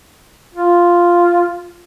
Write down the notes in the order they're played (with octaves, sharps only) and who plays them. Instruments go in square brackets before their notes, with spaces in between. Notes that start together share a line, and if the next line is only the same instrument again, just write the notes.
[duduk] F4